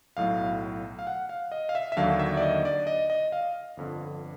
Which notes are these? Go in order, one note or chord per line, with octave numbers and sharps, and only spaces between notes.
B1 A2 F#3 F5
F5
F#5
F5
D#5
F5
E5
E5
D#2 D3 F#3 A#3 D4 F5
E5
D5
D#5
D5
D#5
D#5
F5
G1 F2 D3